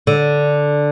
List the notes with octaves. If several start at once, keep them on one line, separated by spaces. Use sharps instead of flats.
D3